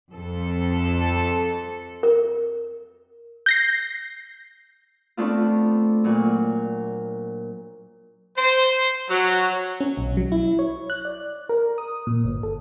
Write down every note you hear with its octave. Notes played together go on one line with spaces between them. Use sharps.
F2 A4
A#4
G6 A#6 C7
A3 B3 C4 D4 F4
A#2 F#3
C5
F#3
C#4
B1
F#3
E4
C#5
F#6
D5
A#4
D#6
A#2
G1
A4